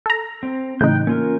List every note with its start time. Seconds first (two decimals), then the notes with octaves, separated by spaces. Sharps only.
0.06 A4 A#5
0.43 C4
0.81 A2 C#3 E3 D#4 G5 F#6 G6
1.07 A#3 C#4 F4 A#4